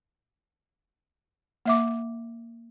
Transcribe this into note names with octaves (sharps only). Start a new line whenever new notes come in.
A#3 E5 D6